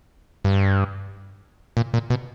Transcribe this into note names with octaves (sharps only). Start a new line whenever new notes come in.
G2
A#2
A#2
B2